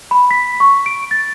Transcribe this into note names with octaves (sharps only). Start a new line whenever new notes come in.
B5
B6
C#6
D7
A6